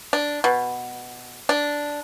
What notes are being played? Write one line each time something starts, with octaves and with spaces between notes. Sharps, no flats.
D4
B2
D4